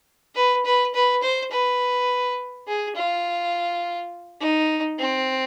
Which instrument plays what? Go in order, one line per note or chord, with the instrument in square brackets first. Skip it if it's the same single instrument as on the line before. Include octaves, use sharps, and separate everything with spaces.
[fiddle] B4
B4
B4
C5
B4
G#4
F4
D#4
C4